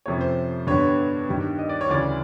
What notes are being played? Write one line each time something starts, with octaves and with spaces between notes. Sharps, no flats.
F2 C3 F3 A3 C#4 C#5
C5
G2 D3 G3 B3 C#5
G2 D#3 G3
D#5
D5
C#5
D2 C#3 E3 D5